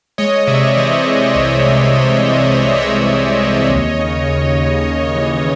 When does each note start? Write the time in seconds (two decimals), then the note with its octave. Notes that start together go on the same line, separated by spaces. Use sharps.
0.18 G#3 C#5 D#5
0.47 C3 D5 E5
0.77 E3 C5 D5
1.07 G#3
1.35 C2
1.65 C2
1.94 C3
2.23 C3
2.52 E3
2.77 E5
2.81 G#3 C#5 D#5
3.11 E3
3.40 C3
3.70 D#2
3.99 C#3
4.28 D#2
4.58 D#2
4.87 D#2
5.16 E3